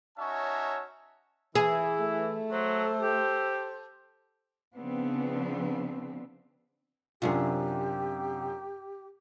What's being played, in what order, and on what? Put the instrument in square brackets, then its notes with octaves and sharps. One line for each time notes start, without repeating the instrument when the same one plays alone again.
[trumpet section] C#4 D#4 F#4 C#5 E5 A5
[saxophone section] E3 [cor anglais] E4 [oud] G#4
[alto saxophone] A3
[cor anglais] F#3 [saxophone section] A4 C5
[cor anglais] G4
[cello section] C#3 F3 B3 C4 D4
[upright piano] F#2 D4 F4 [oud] C3 C#4 G#4 [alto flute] G4